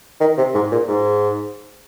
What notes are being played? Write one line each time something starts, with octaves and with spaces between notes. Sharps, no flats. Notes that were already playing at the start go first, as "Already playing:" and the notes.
D#3
C3
G#2
A#2
G#2